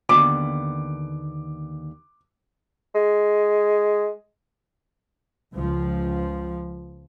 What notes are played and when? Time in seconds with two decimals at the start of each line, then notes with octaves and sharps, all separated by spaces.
0.09 D#2 D3 B3 D6
2.95 G#3
5.53 C#2 F3